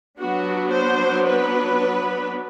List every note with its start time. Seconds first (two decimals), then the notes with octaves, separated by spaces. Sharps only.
0.18 F#3 B3 D4 F#4
0.72 C5
1.28 B4